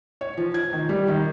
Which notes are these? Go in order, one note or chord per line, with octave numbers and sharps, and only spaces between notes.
C#5
F3
G#6
D#3
G3
D#3